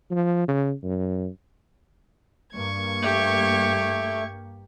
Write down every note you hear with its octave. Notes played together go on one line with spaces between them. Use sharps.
F3
C#3
F#2
G2 A#3 C#6 G#6
A3 G4